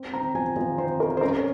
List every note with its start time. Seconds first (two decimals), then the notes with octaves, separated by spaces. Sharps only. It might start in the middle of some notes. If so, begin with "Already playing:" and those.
Already playing: C4
0.13 C4 A#5
0.35 F3 G#5
0.57 F3
0.78 C4 C5
1.00 C4 A#4
1.17 C5
1.21 C#4 A#4
1.38 C#5